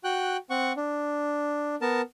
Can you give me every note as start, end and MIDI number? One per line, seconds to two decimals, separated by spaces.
0.04 0.37 66
0.04 0.37 79
0.04 0.37 90
0.50 0.72 60
0.50 0.72 78
0.50 0.72 85
0.77 1.76 62
1.82 2.01 59
1.82 2.01 70
1.82 2.01 81